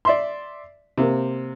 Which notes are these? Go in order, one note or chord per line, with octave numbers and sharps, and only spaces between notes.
D5 E5 C6
C3 A#3